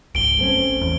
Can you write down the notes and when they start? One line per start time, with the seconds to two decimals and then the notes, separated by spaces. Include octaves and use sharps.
0.15 G#1 C#2 D7 G7
0.38 A3 C4 C#4
0.81 E2